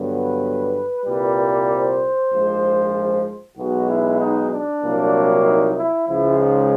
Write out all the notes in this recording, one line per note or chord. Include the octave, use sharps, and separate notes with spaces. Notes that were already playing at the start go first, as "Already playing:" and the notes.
Already playing: G2 D3 F#3 B3
B4
C2 A#2 G3
C5
A#1 G#2 F3 G#3
B1 B2 G#3 B3 F#4
E4
D#4
D4
C2 A#2 F#3 A#3
D#4
E4
C#2 C#3 F3 G#3 E4
D#4